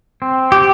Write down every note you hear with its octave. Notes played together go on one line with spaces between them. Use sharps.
C4
G4